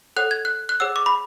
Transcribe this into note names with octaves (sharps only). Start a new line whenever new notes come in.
A4 C#5 F#5 F#6
G#6
F#6
F#6
G#4 C#5 F#5 E6
D6
B5